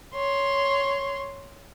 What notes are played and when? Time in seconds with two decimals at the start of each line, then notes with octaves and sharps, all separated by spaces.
0.15 C#5 C6